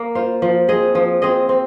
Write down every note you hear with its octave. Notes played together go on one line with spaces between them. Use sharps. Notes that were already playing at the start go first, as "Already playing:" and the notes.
Already playing: A#3
F4 C5 F5
F3
C4 G#4 D#5
F3
C4 G#4 D#5
C4